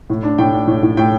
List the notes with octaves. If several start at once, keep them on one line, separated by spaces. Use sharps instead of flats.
A2
D4
A2 G5
D4
A2
A2
A2 G5